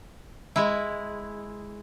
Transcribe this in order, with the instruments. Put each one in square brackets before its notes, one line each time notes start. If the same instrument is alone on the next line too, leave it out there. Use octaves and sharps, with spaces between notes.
[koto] G#3 E4